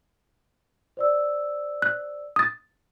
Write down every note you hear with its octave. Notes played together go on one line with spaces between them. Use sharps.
C5 D5 E6
F#6
D#6 A6